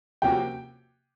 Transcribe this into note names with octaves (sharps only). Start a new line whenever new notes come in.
C3 F3 A#3 C#4 F#4 G5